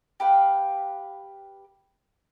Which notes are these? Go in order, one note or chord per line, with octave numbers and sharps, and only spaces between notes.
G4 B4 F5 G5